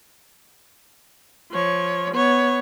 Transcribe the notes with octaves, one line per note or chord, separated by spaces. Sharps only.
F3 C#5
B3 C#5